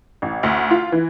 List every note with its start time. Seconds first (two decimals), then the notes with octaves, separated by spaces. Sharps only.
0.22 A1
0.43 D2
0.71 F4
0.92 E3